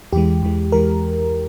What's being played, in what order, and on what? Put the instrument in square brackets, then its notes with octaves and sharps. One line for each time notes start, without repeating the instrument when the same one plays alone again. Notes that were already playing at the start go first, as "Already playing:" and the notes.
[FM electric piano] E2 E3 G#3 G4
E2 E3 G#3
E2 E3 G#3 A#4